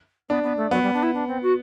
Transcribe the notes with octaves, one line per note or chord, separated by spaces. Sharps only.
B3 D4
B3
A3
F#3 B3
G3
D4
E4
D4
C4
F#4